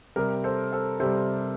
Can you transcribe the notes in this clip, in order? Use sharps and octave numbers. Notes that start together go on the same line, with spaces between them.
C3 G3 G4 A#4
A4 C5
A4 C5
C3 G3 A4 C5